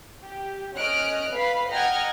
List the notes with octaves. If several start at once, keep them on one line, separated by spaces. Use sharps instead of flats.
G4
C#4 D#5 F6 F#6 D7
B4 F5 B5
D#5 F#5 G5 A#5 F6 G#6